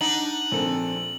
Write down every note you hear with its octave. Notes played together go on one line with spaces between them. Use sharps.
D4 D#4 F#5 F#7
A#1 C4 A4